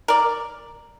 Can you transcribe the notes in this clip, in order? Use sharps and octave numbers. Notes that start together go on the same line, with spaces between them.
A#4 D5